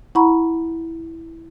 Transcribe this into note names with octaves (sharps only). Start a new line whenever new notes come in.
E4 F#5 A#5 B5 C#6